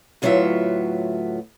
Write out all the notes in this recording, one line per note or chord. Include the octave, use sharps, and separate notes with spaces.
D2 A2 F#3 B3 F4 E5